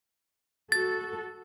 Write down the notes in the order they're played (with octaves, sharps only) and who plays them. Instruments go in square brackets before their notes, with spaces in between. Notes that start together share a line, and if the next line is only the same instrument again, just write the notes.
[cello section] F#4 A4 [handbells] A6